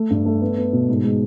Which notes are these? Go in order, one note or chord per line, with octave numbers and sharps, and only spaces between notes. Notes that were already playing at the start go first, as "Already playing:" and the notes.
Already playing: A3
G2
A3
B3
B3
B2
G#2
G#3